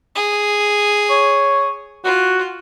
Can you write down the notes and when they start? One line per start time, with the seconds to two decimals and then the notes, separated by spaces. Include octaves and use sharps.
0.16 G#4
1.10 C#5
2.05 F4 F#4